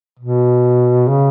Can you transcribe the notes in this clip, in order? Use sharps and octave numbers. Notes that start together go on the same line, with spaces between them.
B2
C#3